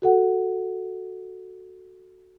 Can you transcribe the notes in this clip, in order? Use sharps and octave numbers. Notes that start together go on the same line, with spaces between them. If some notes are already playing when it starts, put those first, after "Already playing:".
F#4 A4 F#5